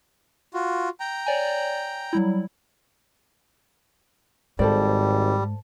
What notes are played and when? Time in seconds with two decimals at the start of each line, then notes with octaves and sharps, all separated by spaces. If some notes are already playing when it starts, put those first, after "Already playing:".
0.54 F4 F#4
1.00 G5 A#5
1.26 C#5 D5 G#5
2.13 F#3 G3 E4
4.59 G#1 G#2 G3 A4 C5 D5